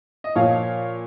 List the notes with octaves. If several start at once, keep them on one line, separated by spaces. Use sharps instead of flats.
D#5
A#2 F3 C#5 F5